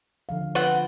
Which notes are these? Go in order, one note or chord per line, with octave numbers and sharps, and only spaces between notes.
D3 F3 F5
B3 C4 F4 B4 F#5